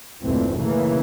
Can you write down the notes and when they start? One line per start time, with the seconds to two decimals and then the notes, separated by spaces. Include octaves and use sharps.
0.23 F#1 D#2 A#2 E3 A3 C4
0.58 C#3 E3 A3 A#3